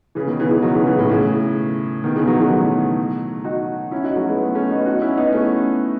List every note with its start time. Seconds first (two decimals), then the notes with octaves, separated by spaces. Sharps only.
0.15 C#3 E3
0.27 B2 D#3
0.39 C#3 E3
0.51 E3 G#3
0.62 D#3 F#3
0.75 C#3 E3
0.86 C#3 E3
0.99 A2
1.09 A2 C#3
2.04 B2 D#3
2.16 C#3 E3
2.27 D#3 F#3
2.39 E3 G#3
2.50 F#3 A3
3.44 D#4 F#4
3.91 C#4 E4
4.04 D#4 F#4
4.16 F#3 A3
4.28 G#3 B3
4.54 A3 C#4
4.70 B3 D#4
4.86 D#4 F#4
5.02 C#4 E4
5.17 B3 D#4
5.32 A3 C#4